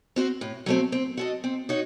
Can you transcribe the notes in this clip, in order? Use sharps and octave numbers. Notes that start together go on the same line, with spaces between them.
C4 F#4 C5
A2
F#3 A3 C4
C4
F#4 A4 D#5
C4
D#4 F#4 C#5